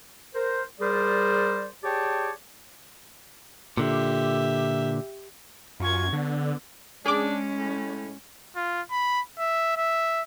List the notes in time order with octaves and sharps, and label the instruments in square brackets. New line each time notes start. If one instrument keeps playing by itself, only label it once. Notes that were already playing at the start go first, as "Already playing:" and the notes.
[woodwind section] A#4 C5
G3 G#4 A#4 C5 D5
G4 G#4 C#5 D5 G5 A5
[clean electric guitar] A#2 D3 [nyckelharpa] G4 E5
[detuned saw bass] F#2 [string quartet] F4 C#6 G#6
[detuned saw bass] D3 [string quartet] B3
[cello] G#3 C#4 [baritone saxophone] D4 [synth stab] G#4 D6
[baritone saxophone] A2
[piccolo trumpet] F4
B5
E5
E5